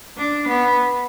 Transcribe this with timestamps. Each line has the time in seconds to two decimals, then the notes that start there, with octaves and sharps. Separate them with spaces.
0.18 D4
0.48 B3